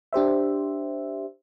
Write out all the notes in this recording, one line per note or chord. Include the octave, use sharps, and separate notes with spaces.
D4 G4 C5 E5